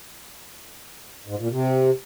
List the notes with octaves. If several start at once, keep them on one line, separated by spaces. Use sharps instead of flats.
G#2
A#2
C3